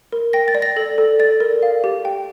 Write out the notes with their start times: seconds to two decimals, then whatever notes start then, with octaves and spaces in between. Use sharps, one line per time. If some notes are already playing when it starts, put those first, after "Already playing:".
0.13 A#4
0.33 G5 A#6
0.48 A6
0.55 D5
0.62 A#6
0.77 A4
0.98 A4
1.19 D5 A6
1.40 A#4
1.63 F5
1.84 G4
2.05 G5